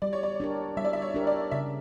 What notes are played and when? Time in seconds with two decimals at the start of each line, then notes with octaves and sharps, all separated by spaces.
0.02 G3 D5
0.13 C#5
0.23 D5
0.40 D4 G4 A#4
0.77 G3 E5
0.85 D5
0.93 E5
1.02 C#5
1.14 D4 G4 A#4
1.27 D5
1.51 C#3 E5